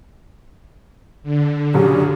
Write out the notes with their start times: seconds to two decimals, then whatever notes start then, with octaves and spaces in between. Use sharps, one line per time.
1.23 D3
1.74 F#2 C#3 F#3 G4